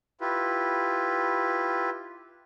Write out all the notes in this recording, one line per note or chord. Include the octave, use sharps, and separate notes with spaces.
E4 F4 G4 B4